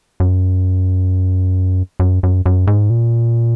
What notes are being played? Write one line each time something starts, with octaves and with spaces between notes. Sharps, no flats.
F#2
F#2
F#2
F#2
G#2
A#2